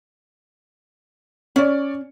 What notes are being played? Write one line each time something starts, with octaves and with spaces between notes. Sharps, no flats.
C#4 C#5 D5